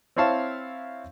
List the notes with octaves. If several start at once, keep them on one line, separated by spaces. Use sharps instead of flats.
C4 E4 C#5 F5 A5